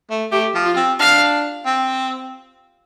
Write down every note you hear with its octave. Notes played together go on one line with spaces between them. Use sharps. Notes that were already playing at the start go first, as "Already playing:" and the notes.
A3
A3 G4
F3
F4
C4
D4 F5
C4